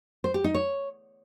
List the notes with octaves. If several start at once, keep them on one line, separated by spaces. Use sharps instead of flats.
C5
G4
D#4
C#5